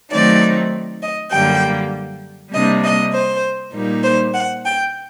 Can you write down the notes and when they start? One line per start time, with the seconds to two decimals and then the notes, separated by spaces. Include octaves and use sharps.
0.11 D#3 F#3 A3 C4 D#4 D5
1.02 D#5
1.32 F#2 D3 G3 A#3 G5
2.53 C3 G3 A#3 D4 D#5
2.84 D#5
3.14 C5
3.73 A#2 G3 A#3 D#4
4.04 C5
4.34 F#5
4.65 G5